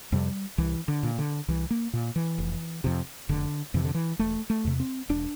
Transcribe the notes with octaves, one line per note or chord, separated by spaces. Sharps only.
F2 C3 G3
C2 E3
D3
A#2
D3
C2 E3
A#3
A#2
E3
F1
F2 C3
F1 D3
F2 C3 E3
D3
E3
E1 A3
A3
E2 C3
C4
E1 D4